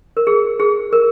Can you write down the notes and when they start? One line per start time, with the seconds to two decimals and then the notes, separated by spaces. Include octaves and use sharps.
0.17 A#4
0.27 G#4
0.60 G#4
0.93 A#4